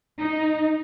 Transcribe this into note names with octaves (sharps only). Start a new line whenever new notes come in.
D#4